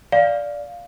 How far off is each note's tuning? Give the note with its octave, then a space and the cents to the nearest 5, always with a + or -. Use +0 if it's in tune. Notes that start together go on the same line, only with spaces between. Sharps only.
D5 -10 F5 +0